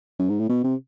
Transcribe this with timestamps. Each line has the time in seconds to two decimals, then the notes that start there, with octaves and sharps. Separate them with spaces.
0.19 F#2
0.29 G#2
0.39 A2
0.49 B2
0.64 C3